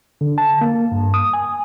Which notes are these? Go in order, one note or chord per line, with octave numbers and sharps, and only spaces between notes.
D3
A5
A#3
G2
D#6
G#5